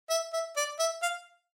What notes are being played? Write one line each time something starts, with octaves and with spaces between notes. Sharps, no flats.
E5
E5
D5
E5
F5